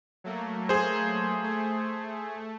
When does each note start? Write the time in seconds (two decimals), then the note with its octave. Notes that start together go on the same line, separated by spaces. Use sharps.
0.24 F#3 A3 A#3
0.69 G#4 C5
1.43 A3